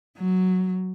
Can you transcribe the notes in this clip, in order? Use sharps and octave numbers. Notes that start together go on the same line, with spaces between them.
F#3